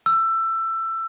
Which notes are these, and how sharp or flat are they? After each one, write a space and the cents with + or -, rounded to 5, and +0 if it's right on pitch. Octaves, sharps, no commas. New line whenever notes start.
E6 +20